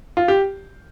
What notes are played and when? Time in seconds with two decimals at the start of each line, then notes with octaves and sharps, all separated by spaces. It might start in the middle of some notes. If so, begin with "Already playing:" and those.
0.17 F4
0.28 G4